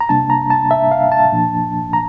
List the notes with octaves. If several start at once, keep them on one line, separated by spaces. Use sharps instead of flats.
A#5
C3 G3 A#3 D4 A5
A#5
A5
E5
F5
A5
A#2 F3 A#3 D4
A#5